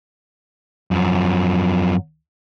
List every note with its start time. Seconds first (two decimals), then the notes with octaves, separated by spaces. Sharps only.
0.91 F#2 F3